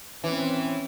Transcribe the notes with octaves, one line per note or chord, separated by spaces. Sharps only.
E3 C4 C#4